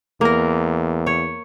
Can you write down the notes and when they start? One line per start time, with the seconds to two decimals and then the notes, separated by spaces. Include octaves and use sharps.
0.21 E2 A#3 A#4
1.07 C#5